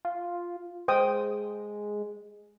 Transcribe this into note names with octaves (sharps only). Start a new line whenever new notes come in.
F4
G#3 C5 G5 D#6